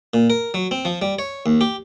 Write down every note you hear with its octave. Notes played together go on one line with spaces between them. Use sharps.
A#2
A#4
F#3
C4
F3
G3
C#5
D#2
G4